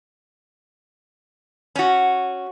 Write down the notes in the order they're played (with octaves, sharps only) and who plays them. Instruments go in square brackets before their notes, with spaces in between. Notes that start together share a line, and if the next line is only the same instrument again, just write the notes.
[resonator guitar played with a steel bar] C#4 F#4